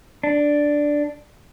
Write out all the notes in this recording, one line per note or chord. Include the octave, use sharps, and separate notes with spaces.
D4